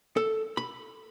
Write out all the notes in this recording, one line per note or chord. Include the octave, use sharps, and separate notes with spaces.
A4
B5